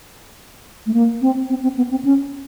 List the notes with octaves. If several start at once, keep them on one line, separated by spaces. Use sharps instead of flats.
A3
A#3
C4
C4
C4
B3
C4
C#4